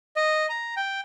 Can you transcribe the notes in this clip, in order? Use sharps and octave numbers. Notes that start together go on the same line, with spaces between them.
D#5
A#5
G5